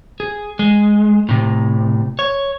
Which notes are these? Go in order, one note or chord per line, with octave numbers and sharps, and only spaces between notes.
G#4
G#3
A2 C3
C#5